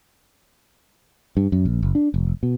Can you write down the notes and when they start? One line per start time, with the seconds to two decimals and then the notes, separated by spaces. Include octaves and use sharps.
1.37 G2
1.52 F#2
1.65 A#1
1.83 F#1
1.95 D4
2.14 F1
2.43 B2